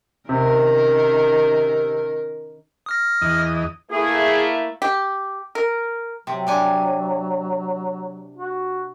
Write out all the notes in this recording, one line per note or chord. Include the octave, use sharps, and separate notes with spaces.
C3 D#3 C#4 A#4
D#6 F6 A#6
E2 D#5
A3 A#3 E4 G#4
G4
A#4
C3 F#3
C3 D4 G#5
F#4